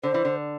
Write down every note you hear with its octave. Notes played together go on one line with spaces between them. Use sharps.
D3 C5
E3
D3